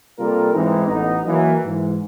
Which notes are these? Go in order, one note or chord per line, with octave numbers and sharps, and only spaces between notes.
C3 G3 A#3 F4 A4 A#4
G#2 E3 G#3 C4 D#4
A1 B3 D#4
E3 F#3 A#3
G#2 E3